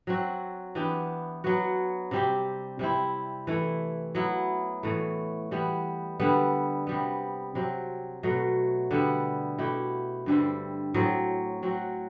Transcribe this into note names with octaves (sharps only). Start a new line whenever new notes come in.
F#3 C4 F#4
E3 B3 D4 G4
F#3 B3 F#4
C3 G3 C4 G4
C3 G3 C4 E4
E3 A3 E4
F#3 B3 E4
A2 E3 A3
E3 G3 B3
D3 G3 B3
C3 G3 B3
C3 F#3 C4
B2 F#3 A3
D3 G3 B3
B2 A3 E4 G4
G2 D3 G3 C4
A2 F#3 C4
F#3 C4 F#4